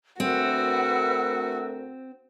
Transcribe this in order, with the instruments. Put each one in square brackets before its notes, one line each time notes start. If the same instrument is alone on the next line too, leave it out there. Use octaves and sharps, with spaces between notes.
[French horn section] D2 A3 A#4 [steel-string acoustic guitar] C4 [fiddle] F#4 [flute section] B4 F#5 E6